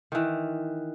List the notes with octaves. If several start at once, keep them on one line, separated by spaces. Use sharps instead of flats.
D#3 E3